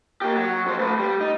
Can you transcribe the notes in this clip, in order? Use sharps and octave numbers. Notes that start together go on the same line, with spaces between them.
A#3 G4
F#3
F2 C5
A3 B4
G3
D#4